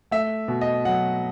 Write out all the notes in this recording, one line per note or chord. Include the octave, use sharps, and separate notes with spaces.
A3 E5
B2
D#5
F#3 F#5